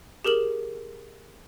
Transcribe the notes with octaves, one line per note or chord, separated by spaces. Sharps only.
G4 G#4 A#4 E7 F#7